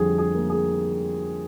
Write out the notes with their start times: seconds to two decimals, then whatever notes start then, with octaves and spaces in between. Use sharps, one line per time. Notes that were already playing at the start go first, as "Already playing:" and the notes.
Already playing: F2 D3 G3 G#4
0.18 G#4
0.35 A#3
0.50 G#4